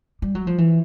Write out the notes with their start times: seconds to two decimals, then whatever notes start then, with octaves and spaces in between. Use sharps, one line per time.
0.22 G3
0.35 F#3
0.47 F3
0.58 E3